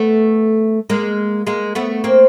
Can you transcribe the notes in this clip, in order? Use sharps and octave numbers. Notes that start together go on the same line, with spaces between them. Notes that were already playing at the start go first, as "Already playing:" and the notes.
Already playing: A3 B3
G#3 A#3
G#3 A#3
A3 B3
A#3 C4